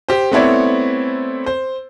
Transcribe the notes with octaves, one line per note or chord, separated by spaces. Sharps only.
G4 C5
A3 B3 C4 E4 C#5 D5
C5